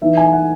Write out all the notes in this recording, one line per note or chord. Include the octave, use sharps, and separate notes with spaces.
E3 B3 D#4 E5
G#5
F#5